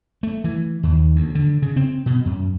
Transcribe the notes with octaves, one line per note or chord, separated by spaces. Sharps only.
A3
E3
D#2
D2
D3
C#3
C4
B2
F#2